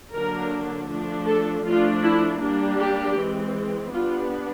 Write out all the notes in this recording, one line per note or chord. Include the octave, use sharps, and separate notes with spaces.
D3 F#3 A#3 D4 A#4
F3 A3 D4
A4
F3 A3 D4 F4
E4
G3 A#3 D4
G4
E3 G#3 C4
G3 B3 D4 F4